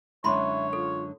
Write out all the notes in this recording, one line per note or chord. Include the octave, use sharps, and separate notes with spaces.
F#2 D3 G#3 E4 C#5 E5 B5 C6
F4 A4